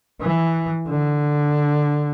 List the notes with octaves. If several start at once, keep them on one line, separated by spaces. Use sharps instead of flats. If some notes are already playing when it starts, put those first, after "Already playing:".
E3
D3